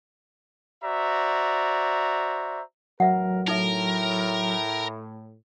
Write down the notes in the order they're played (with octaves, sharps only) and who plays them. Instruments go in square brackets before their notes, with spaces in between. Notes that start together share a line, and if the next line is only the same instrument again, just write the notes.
[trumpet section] F#4 C5 D5 E5 A#5
[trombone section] A1 A#4 [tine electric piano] F#3 [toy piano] E5 F#5
[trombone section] A2 [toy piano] D#4 A4 E5 [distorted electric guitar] A#4